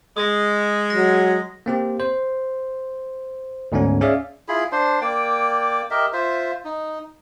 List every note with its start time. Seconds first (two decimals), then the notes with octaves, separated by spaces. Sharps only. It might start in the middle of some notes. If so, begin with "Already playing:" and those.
0.17 G#3 D#6 A#6
0.90 F#3 A#6
1.66 A#3 C4 G4
2.00 C5
3.72 D2 G#2 B3 C#4
4.01 C#4 G#4 D5 E5 F5
4.48 E4 F4 G#4 B5
4.72 D4 C5 C6
5.01 A#3 D5 G5 D6
5.91 G4 A#4 D#5 E5
6.13 F4 C5 E5
6.65 D#4